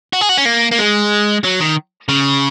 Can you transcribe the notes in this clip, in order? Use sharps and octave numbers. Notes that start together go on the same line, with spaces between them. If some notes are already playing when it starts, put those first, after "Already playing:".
F#4
G#4
F#4
C#4
A#3
A#3
G#3
F#3
D#3
C#3